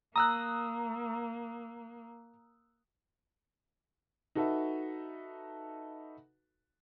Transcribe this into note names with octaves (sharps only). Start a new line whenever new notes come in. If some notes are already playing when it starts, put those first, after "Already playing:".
A#3 A#5 D#6 E6 F#6
D#4 F#4 A4 B4 E5